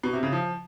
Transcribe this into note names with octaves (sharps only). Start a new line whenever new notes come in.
B2
C3
C#3
F3